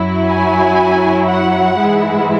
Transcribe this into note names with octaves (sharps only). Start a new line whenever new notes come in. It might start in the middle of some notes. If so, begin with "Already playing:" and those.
Already playing: F#2 F#3 E4
G#5
F#5
G#2 E3 G#3 E4